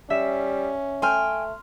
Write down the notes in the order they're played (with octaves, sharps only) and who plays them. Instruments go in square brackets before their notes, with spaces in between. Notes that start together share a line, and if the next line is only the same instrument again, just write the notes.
[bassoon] G3 [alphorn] C#4 [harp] E5 E7
[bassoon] A3 [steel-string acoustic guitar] G5 G#5 [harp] C6 F6